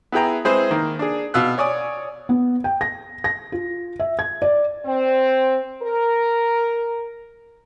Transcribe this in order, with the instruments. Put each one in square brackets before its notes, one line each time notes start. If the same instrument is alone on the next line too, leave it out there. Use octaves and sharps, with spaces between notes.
[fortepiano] B3 E4 G#4 G5 A#5
G#3 C4 E4 G#4 B4 C5
D#3 A#3
D4 G#4
B2 F5 E6 F#6
C#5 D5 G#5 D#6
[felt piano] B3
G5
A#6
A#6
F4
E5
G#6
D5
[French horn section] C4
A#4